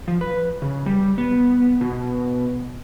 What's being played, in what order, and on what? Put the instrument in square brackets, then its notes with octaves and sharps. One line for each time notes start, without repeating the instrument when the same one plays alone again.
[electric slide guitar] F3
B4
C#3
G3
B3
B2